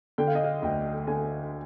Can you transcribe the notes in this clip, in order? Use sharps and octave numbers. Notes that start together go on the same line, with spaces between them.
D3 G5
F5
D#5
F5
D2 G5
D3 G#5